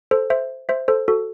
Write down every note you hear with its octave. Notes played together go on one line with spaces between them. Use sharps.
A4 C5
C5 E5
C5 E5
A4 C5
F#4 A4